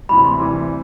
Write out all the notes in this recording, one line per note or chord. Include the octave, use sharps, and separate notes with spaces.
D2 C3 E3 G3 B5
C6
D2 C3 E3 G3